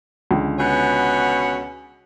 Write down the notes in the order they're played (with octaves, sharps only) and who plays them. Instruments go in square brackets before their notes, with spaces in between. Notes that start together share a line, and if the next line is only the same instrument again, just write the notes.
[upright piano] C#2 D3
[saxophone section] B2 C#4 F#5